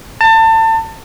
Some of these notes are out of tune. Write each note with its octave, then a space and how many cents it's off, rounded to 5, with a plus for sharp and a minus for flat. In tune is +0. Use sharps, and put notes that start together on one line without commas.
A5 +30